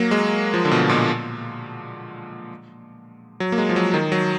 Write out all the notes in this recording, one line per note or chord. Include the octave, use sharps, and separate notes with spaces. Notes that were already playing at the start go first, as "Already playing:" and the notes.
Already playing: F#3 A#3
G#3
F3
D3
B2
A#2
F#3
A#3
G#3
F3
F#3
D#3
F#3